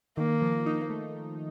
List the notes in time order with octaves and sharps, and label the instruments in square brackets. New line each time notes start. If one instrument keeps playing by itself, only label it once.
[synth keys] D#3 [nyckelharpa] A#3
[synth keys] F3
D#4
A3